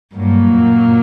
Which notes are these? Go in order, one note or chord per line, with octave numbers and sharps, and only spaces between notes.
G2 A#2 F#3 A#3
F#2